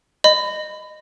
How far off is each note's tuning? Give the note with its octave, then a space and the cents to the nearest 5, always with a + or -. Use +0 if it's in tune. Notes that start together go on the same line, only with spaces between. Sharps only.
D#5 -20 B5 +25